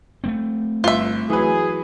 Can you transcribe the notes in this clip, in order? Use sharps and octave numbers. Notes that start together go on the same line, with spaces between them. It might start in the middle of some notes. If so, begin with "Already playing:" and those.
A3 A#3 C4
G1 F4 E5
E3 F#3 G#4 B4